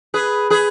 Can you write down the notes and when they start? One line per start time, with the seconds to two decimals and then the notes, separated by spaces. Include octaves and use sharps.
0.14 G#4 B4
0.50 G#4 B4